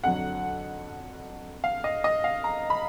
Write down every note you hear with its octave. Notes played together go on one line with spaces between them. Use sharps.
F2 D3 F#3 F#5
F5
D#5
D#5
F5
A#5
B5